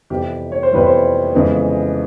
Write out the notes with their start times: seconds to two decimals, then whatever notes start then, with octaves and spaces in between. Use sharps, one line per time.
0.10 F2 C3 E3 G3 B3 G4
0.52 C#5
0.63 C5
0.72 F2 C3 E3 G3 B3 B4
0.86 C5
1.33 F2 C#3 E3 G#3 B3